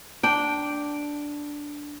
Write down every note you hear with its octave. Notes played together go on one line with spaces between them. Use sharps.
D4 G5